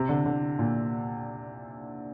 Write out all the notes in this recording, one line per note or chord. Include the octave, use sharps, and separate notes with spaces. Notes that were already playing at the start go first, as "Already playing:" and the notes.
Already playing: C3
D3
D3
A#2